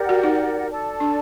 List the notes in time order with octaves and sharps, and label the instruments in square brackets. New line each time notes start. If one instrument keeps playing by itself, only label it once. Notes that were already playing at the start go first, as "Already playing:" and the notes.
Already playing: [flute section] G4 A#4 D5 F#5
[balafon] F#4
D#4
[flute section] A4 D5 A5
[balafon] D4